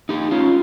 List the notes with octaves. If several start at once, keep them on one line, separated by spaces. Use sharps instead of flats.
D#4 G4
C#4 F4